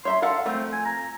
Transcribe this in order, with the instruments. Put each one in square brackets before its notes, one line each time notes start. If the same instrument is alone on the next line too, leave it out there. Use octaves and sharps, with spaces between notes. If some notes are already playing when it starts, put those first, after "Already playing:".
[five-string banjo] C#5 E5 A#5 [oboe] C6
[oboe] A4 [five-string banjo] A#4 F5 F#5
[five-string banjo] F3 A3 [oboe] C4
[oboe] G#5
A#5